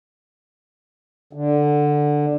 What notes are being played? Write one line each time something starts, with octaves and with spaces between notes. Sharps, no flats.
D3